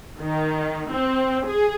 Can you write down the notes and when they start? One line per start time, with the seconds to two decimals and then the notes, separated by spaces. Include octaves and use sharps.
0.19 D#3
0.90 C4
1.45 G#4